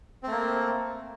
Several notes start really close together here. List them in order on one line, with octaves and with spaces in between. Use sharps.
C4 A3 A#3